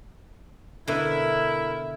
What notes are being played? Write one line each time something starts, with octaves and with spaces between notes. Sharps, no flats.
B2 D3 E4 A#4 E5